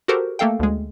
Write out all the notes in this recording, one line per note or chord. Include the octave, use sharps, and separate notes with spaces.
F#4 G4 A4 A#4 C5
A3 A#3 A4 F5 G5
D2 G#3